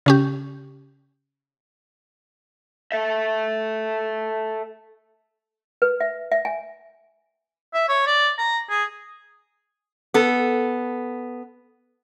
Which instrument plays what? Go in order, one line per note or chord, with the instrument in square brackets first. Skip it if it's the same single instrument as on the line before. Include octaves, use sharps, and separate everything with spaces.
[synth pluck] C#3 C#4 G4
[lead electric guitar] A4 E5
[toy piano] B4
E5
E5
G#5
[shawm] E5
C#5
D5
A#5
G#4
[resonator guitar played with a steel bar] B3 A4